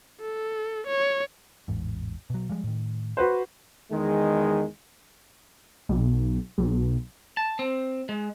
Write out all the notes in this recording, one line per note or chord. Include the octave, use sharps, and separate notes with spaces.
A4
C#5
A1 E2 G#2
B2 F#3
F3 G3 G#3
A2 D#3
F#4 B4 C5
E2 D#3 G#3
B1
B1
A5
C4
G#3